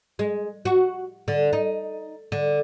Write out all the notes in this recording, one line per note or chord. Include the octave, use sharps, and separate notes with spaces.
G#3
F#4
D3
D#4
D3